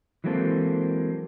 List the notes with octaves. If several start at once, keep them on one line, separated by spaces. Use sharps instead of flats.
E3 F#3 G#3 A#3 C4 A4